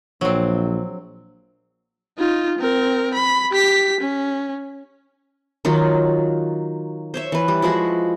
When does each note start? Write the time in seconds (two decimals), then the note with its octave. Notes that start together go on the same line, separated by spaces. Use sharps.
0.21 A#1 F#3 C4
2.19 D#4 F4
2.59 C4 A#4
3.14 B5
3.51 G4 B6
4.01 C#4
5.65 D#3 F#3 F4 F#4
7.14 C5 C#5 E5
7.32 E3 B4
7.48 G3
7.62 F3 G#3 E4 F#4